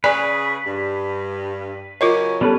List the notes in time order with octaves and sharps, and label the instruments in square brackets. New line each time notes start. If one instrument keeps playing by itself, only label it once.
[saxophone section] C#3 G#4 [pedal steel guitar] B4 [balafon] D5 G#5
[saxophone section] G2
[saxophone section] C#3 F#3 C#4 [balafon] F4 A#4 D#5 [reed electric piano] C#5
[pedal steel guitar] G3 C#4 B4 [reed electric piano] B3 A4